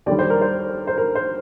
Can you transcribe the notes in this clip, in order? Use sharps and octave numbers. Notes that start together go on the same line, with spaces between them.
D#2 D3 G3 D5
C5
A#4
C5
C5
A#4
C5